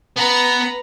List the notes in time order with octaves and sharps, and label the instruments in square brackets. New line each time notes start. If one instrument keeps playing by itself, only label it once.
[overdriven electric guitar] B3 [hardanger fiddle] B4 A#5